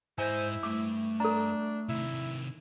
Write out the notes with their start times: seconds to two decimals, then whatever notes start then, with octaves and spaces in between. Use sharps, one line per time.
0.18 G#2 E4 C5 D#5 G#5
0.63 G2 A3 D6
1.20 D4 A4 A#5
1.89 C3 D#3 E4